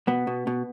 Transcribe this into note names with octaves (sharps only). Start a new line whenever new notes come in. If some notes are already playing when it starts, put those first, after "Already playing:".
B2 B3
B2
B2